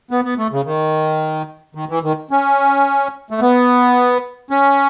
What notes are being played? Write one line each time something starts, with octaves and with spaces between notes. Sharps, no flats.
B3
B3
A3
C#3
D#3
D#3
E3
D#3
C#4
A3
B3
C#4